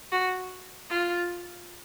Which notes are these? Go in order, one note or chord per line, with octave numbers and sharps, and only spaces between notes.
F#4
F4